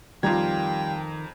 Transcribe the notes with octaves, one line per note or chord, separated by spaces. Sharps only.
F2 D#3 G3 F4 G5 A#5 G#6